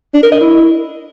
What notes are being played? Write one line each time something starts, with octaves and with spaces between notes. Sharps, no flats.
D4
A#4
D#5
E4